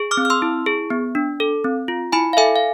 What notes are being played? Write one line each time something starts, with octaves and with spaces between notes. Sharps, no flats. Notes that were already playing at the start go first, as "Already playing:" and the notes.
Already playing: G#4
D6 F6
C4
F6
C6 E6
E4
G#4
B3
D4
A4
C4
F4
E4 G#5 B5
F5
A4 E5 G#5
F5